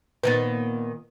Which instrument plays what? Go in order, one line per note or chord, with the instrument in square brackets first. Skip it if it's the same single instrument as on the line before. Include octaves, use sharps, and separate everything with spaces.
[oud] A#2 D#3 B3 [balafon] B4